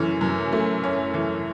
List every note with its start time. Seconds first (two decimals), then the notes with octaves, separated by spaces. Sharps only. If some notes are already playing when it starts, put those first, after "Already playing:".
Already playing: F#2 E3 A3 C#4
0.21 F#2
0.52 A3
0.84 C#4
1.14 E3